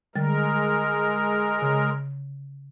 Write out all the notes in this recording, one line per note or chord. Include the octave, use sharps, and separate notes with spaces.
D3 G3 G#3 A#4 A6
C#3